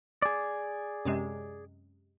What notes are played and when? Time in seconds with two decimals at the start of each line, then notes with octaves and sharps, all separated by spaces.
0.22 G#4 D5
1.05 F#2 C3 G#3